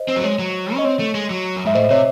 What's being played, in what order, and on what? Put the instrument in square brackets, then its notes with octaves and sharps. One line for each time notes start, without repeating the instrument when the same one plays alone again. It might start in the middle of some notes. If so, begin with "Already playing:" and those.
Already playing: [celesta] C5 D#5
[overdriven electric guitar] C4
F#3
[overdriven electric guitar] G#3 [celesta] C#5
[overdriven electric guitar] F#3
[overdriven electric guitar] C#4 [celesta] D#5
[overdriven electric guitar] C4 [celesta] C#5
[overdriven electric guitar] A3
G#3
F#3
F#2
[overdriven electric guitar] G#2 [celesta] E5
[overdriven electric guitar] A2 [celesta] C5 D#5
[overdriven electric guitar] C3 [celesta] C#5 E5